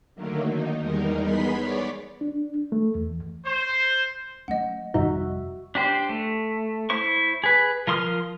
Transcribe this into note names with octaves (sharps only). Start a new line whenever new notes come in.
D3 D#3 F#3 A3 A#3
D#3 D#4
E2 G3 G#3 D#4 A#4
B3 G#4 B5 C6 B6
C#5 D5
D4
A3
E2
C5
F#3 A3 C#4 D#5 F#5
G#1 F2 C3 G3 D#4 F#4 E5
D4 G4 C5
A3
E4 C5 C#6
G#4 B4
F3 A#4 C6 D#6 F6